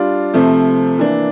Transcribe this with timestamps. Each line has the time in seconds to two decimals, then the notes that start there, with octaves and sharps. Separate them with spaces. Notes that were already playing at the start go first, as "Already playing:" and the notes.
Already playing: G3 D4 F4
0.34 C3 F3 A3 C4
0.99 E3 A#3 D4